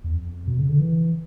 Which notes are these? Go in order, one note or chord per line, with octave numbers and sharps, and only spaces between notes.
E2
F2
B2
C#3
D3
E3